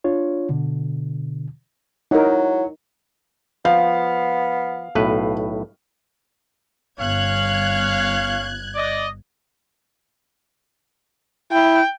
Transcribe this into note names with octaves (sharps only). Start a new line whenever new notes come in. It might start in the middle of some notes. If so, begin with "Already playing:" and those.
D4 F4 C#5
B2 D3
F#3 D#4 E4 A#4
F3 B3 F5
B1 A2 B4
G1 C#4 C#5 F5 F#6 G#6
D5 D#5
E4 G5